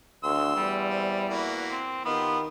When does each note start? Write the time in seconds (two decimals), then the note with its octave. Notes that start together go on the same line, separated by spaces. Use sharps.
0.23 D2 C6 E6
0.56 E2 G3
0.89 C4
1.30 E3 A#3 F#4
1.71 C4
2.05 D#3 B3 F4 G4